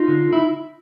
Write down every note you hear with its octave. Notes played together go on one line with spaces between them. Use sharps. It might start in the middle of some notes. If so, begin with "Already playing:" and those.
Already playing: D#4 F4
D3
E4